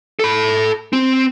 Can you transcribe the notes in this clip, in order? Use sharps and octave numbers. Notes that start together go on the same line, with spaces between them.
A4 B5
C4